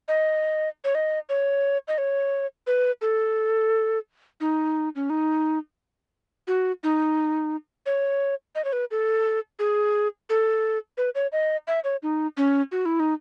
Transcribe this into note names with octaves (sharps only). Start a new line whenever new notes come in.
D#5
C#5
D#5
C#5
D#5
C#5
B4
A4
D#4
C#4
D#4
F#4
D#4
C#5
D#5
C#5
B4
A4
G#4
A4
B4
C#5
D#5
E5
C#5
D#4
C#4
F#4
E4
D#4